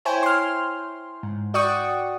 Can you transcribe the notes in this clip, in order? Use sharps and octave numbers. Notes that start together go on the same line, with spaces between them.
E4 C5 C#5 G5 G#5
C6 F6
G#2
F#4 D5 F#5 G5 C#6 D#6